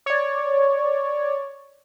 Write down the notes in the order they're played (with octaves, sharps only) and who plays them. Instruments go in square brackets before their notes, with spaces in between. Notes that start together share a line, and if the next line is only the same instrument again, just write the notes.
[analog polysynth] C#5 D5